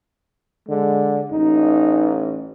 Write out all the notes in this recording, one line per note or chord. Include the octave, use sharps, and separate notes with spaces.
D3 G#3
A1 D#4